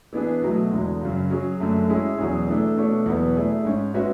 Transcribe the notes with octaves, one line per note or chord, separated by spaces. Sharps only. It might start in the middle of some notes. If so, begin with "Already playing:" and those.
E3 B3 D4 G#4
B2 F#3 A3
E2 D3 G#3
F#2 C#3 F#3
F#3 C#4 G#4
F#2 D3 F#3 A3
G#3 C#4 E4 G#4
E2 B2 F#3 C#4 G#4
E3 A3 D4 A4
B2 A3 D4 A4 C#5
E2 B2 F#3 B3
A3 E4 G#4 D5
G#2 G#3 C#4
G#3 C#4 F#4 B4 E5